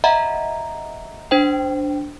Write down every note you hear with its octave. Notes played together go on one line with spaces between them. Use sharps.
D#5 E5 F#5 A#5 B5
D4 C5 G5